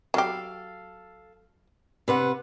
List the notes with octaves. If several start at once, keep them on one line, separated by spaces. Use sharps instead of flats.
F#3 G4 A4 F5
C3 B4 F#5